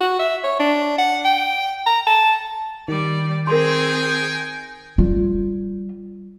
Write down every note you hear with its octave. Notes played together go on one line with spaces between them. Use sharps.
F#4
E5
C#5
D4
F#5
G5
A#5
A5
D#3 G3 D5
C4 D#4 G#4 A#4 G5 G#5 C6
G3 F4